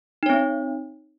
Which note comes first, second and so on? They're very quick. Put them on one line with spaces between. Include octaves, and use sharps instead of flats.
D#4 C#5 C4